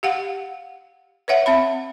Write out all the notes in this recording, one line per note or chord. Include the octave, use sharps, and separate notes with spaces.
G4 F5 F#5
B4 C#5 E5 F#5
C4 E5 B5